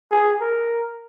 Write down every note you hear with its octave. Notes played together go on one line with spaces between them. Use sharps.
G#4
A#4